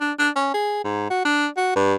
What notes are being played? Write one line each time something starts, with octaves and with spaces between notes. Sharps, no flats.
D4
D4
C#4
G#4
G#2
F#4
D4
F#4
G2